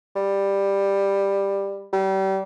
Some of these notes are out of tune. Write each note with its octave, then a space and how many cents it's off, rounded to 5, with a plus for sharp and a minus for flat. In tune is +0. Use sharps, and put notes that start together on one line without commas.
G3 +10
G3 -30